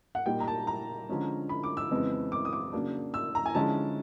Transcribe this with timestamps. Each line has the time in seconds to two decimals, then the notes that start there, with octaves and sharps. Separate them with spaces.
0.15 F#5
0.26 A#2 G3 A#3 D#4 G5
0.40 A#5
0.48 A5
0.67 A#5
1.09 D3 F3 G#3 C#4
1.49 B5
1.64 D6
1.77 E6
1.91 F2 C#3 E3 G#3 B3
2.32 D6
2.45 D#6
2.53 D6
2.73 C#3 F#3 A#3 D4
3.14 E6
3.35 A#5
3.46 G#5
3.55 D3 F3 G#3 C#4 E4 A5